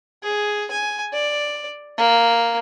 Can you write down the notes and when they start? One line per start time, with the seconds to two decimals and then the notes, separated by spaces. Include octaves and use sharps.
0.23 G#4
0.71 G#5
1.13 D5
1.98 A#3